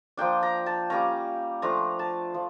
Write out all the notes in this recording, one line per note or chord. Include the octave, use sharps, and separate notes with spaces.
F3 A#3 D4 G5
A#5
A5
G3 A#3 C#4 A#5
F3 A3 D4 F4 A#5
A5
F3